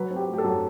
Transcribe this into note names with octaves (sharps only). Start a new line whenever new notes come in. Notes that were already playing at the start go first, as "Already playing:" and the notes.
Already playing: F#3 B4
C4
G4
A3
G4
A4
F#2